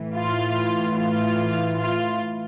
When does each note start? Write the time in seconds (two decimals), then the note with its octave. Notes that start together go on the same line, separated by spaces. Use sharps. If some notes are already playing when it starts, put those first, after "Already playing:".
Already playing: A2 E3
0.14 F4
0.96 F4
1.79 F4